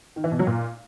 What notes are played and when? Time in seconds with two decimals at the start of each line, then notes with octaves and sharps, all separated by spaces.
0.16 D#3
0.24 E3
0.32 B2
0.39 F#3
0.47 A#2